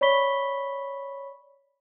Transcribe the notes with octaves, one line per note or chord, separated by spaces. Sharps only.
C#5 D5 B5 C#6 B6 G7